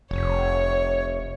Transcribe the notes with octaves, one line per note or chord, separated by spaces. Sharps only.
F1 C#5